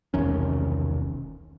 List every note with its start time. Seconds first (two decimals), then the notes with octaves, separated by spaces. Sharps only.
0.14 E1 C2 D#3 C#4